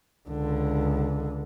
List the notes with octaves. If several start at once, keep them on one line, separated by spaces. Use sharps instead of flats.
C#2 D3